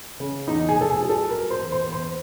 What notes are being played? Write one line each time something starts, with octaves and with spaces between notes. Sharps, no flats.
C#3
E2 D#4
G#4
F1
A4
G#4
F#3
A4
F#3 A#4
C5
E2
C5
E2
C5